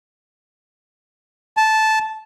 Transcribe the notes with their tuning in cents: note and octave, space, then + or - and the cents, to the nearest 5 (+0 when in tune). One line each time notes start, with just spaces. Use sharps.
A5 -10